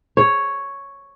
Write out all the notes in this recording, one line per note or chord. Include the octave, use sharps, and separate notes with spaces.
C#5